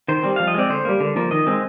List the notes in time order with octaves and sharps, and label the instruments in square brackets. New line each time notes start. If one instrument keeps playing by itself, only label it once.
[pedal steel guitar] D#3 C5
G3 C4
F3 F5
D#5
G#3 C4 D5
D3 C5
G3 A#3
D3
F3 A#3
D#3 D#5
G#3 C4